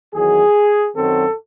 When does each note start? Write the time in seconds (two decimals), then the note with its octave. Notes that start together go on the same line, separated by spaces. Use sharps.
0.15 E2 D#3 F#3 G#4
0.97 F#2 D#3 F#3 C4 A4